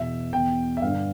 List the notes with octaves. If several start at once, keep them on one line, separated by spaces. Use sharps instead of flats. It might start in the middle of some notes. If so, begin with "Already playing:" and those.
Already playing: E2 B2 E5
E2 B2 G5
E5
G2 D3 F5